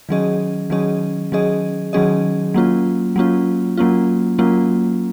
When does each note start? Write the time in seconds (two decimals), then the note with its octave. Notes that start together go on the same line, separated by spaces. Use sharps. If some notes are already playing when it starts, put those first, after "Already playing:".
0.09 D#3 F#3 C#4 G#4 D#5
0.70 D#3 F#3 C#4 G#4 D#5
1.32 D#3 F#3 C#4 G#4 D#5
1.93 D#3 F#3 C#4 G#4 D#5
2.54 F#3 A#3 C#4 F4
3.16 F#3 A#3 C#4 F4
3.77 F#3 A#3 C#4 F4
4.39 F#3 A#3 C#4 F4